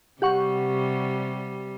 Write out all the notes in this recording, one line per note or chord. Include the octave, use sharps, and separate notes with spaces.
C3 G3 G4 F#5 C#6